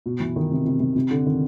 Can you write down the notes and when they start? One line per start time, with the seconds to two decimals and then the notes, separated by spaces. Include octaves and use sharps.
0.06 B2
0.20 E3
0.36 D#3
0.51 C3
0.66 C3
0.80 C3
0.96 C3
1.11 D3
1.26 D#3